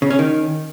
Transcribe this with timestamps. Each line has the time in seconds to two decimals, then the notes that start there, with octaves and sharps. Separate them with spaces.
0.02 C#3
0.10 C#4
0.19 D#3